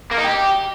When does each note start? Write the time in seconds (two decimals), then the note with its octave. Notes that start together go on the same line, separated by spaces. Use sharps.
0.11 A#3
0.18 D#4
0.24 G4